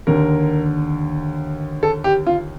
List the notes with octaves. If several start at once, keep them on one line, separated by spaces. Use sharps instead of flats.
D#2 D3 A#4
A4
G4
F4